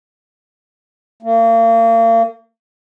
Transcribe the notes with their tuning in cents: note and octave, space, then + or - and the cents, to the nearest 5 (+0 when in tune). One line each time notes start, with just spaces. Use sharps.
A#3 -35